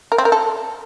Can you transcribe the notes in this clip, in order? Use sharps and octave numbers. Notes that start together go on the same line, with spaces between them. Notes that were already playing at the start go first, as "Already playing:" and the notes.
A#4
C4
A#4
A4